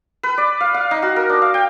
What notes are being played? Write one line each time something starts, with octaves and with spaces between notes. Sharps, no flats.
B4
D5
F5
F5
D#4
F#4
A#4
D4
F5
G5